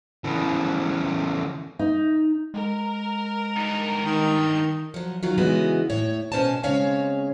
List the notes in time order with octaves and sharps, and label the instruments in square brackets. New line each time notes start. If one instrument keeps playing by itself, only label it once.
[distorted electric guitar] C#3 E3
[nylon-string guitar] D#4
[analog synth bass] G#3 [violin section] A#4
[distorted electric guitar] G2 D#4
[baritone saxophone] D#3
[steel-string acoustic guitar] F3 F#3
D#3 F#3 F4
C#3 E3 G#3 B3 D#4 F#4
A2 C#5
B2 C#4 C5 G#5 A5
C#3 G#3 C4 C#4 C#5 F5